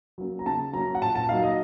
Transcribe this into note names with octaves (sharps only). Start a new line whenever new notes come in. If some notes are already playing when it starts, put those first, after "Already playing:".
F#3 A#3 C#4
A#5
C#3 A5
F#3 A#3 C#4 A#5
F#5
A#2 A5
A5
F#3 A#3 D#4 F5
D#5